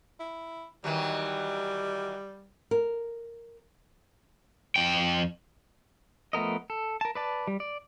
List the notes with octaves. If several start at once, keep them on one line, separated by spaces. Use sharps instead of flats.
E4
D#3 E3 F#3 G3
A#4
F2 G5
F3 A3 B3 A#4 D#5
A4
A#4 A5
B4 D5 A5
G3
D5